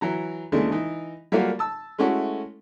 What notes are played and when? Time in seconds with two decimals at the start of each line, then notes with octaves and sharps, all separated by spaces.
0.01 E3 F#3 A#5
0.52 D#2 C#3 E3 G#3 A3 D4
0.72 E3 D#4
1.32 F#3 G3 A3 A#3 F4 F#4
1.59 A5 E6
1.98 G#3 A3 C#4 E4 F#4 A4